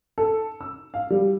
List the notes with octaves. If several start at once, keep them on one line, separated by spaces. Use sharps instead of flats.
A4
E6
F5
G3